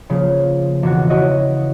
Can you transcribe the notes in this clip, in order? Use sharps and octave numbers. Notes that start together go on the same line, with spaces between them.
C#3 F3 A#3
E1 F#4
E4 F#4 C#5 D#5